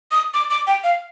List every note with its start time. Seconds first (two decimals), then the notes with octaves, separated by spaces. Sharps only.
0.11 D#6
0.34 D6
0.50 D6
0.67 G5
0.84 F5